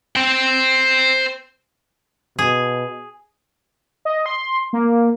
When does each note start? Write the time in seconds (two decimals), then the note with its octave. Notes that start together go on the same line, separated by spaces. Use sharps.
0.16 C5 G5
2.39 B2 G#4
4.05 D#5
4.26 C6
4.73 A#3